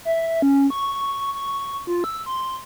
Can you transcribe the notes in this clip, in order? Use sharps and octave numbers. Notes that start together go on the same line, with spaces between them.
E5
C#4
C#6
C#6
F4
E6
C6